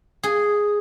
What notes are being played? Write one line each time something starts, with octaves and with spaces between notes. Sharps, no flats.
G#4